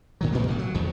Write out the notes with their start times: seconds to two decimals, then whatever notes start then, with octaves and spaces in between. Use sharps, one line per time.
0.21 A2 D#3 F#3
0.32 A2 E3 A3 A#3
0.47 D1 B1 C3 A#3
0.59 F#3
0.75 E2 D#3